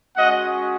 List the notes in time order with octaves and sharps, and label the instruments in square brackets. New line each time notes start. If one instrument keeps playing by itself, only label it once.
[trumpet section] G#3 C#4 F#4 D#5 F#5